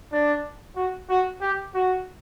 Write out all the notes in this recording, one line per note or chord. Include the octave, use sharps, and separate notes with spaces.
D4
F#4
F#4
G4
F#4